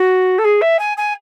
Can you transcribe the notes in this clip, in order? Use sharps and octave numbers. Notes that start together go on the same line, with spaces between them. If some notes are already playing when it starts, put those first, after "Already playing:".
Already playing: F#4
A4
G#4
E5
G#5
G#5